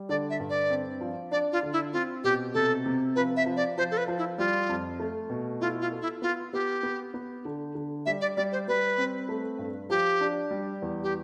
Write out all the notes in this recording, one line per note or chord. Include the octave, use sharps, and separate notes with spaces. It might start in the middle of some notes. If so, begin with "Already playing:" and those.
Already playing: G3
D3 D5
E5
G2
D5
C4
F3
D4 D5
F4
D3
E4
C4 F4
B2 G4
C3 A4
C3
F3 B4
E5
F3
D5
F3 C5
A4
B4
F3
E4
G3 F4
F2
A3
B2
E4 F4
F4
A4
E4
B3 F4
B3 G4
B3
B3
D3
D3
G3 E5
D5
G3 D5
C5
G3 B4
C4
A3
G2
F3 G4
D4
G3
E2
G4